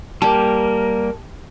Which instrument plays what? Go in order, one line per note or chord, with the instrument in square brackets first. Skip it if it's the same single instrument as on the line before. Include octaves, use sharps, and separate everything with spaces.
[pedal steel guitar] G3 A#3 [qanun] G4 [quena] A#4 [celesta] A5